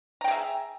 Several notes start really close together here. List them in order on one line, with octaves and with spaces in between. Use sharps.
A#5 G5 G#4 E5